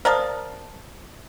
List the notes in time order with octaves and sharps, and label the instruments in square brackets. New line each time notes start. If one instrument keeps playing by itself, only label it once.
[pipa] A#4 F5 A5 [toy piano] C5 D5 D#6